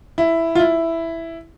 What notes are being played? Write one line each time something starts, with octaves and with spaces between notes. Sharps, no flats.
E4
F4
E4